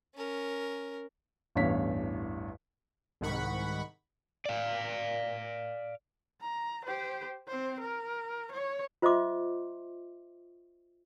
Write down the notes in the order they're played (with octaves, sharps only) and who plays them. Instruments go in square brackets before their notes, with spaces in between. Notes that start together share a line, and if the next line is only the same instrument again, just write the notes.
[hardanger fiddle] C#4 A#4
[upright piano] A1 E2 G2 C#5 F5 B6
[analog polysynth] C2 G#2 D#3 F#5 B5 C#6
[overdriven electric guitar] D5 F5
[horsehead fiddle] A#5
G4 C5
C4 C5
A#4
C#5
[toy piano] F4 C5 D#5 E5 C6 D6